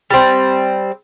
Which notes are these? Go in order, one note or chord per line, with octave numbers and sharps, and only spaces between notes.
G3 C4